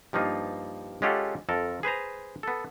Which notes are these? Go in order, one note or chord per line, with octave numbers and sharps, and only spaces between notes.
G2 F3 A#3 D#4 F4
G#3 C#4 F4 G4 A4 F#5
F2 A4 A#4
G#4 B4 C5 A#5
B3 A4